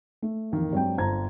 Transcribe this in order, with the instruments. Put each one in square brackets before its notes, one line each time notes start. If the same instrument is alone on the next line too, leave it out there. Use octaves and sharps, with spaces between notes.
[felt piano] A3
[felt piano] A1 F2 [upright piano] D#3 A#3
[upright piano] G2 F#3 [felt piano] G#3 C4 G5
[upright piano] G1 A5 G#6 [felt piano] C5 A#5